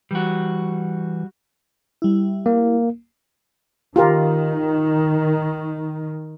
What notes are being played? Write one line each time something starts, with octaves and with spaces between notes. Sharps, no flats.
E3 G3 F#4
G3 E4
A#3
D#3 F4 G4 A#4